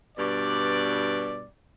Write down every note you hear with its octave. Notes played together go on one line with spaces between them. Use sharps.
G2 B2 D5